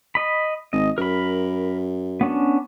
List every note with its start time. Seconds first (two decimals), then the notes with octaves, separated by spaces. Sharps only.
0.15 D#5 B5
0.73 G#1 D#5
0.98 F#2 A#4 B5
2.21 B3 C#4 D4